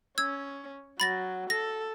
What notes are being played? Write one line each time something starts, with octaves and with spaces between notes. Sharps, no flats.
C#4 E6 G#6
F#3 B5 A6 A#6
A4 A#6